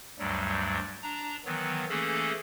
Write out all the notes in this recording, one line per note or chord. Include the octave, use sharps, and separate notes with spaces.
D2 G2 F#3 G3
D4 A#5
D#3 E3 F#3 B3
E3 A3 A#3 C#4 G#4 A4